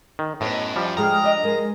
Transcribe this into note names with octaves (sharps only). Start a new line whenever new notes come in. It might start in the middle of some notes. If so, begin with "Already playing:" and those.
D#3
F#2 A2 E3 B3 D#5
F3 G3
D3 G#3 G#4 G5 A#5 D#6 F6
D4 D#5
G#3 G#4 A#4 D#5